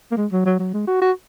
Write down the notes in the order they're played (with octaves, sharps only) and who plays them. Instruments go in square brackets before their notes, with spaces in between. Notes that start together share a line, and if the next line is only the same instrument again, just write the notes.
[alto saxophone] A#3
G#3
F#3
F#3
F#3
G#3
F#4
F#4